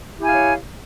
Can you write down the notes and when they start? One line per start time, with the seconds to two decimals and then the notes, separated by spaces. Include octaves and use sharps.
0.15 G4
0.19 E4
0.23 G#5
0.28 F5
0.32 C#5